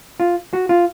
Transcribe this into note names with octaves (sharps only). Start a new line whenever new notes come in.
F4
F#4
F4